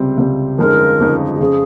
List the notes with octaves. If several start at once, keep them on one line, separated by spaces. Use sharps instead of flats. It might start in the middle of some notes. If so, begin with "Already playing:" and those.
Already playing: C#2 C3 G3 C4
C#2 C3 G3 C4
G1 F2 C#3 G#3 D#4 A#4
G1 F2 C#3 G#3 D#4
G4
F2 C#3 G#4